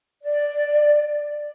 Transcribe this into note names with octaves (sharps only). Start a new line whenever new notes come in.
D5